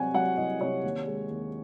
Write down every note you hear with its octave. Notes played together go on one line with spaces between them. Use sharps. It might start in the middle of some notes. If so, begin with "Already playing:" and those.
Already playing: C2 C3 F#3 C4 C#5 F#5 G#5
F#3 F#5
C2 D#5
C3 C#5
D#2
G#3
D#2